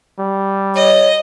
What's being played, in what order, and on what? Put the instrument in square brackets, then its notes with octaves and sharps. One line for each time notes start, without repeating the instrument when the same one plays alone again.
[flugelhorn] G3
[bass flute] C#5 [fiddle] D#5